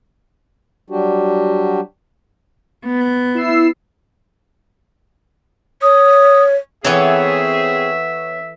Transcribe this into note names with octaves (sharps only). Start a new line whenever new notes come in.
F#3 G3 D4 F#4 G4
B3
E4 E6 C7
C#5 D#6
E3 B3 C4 G#4 A4 C#5 E5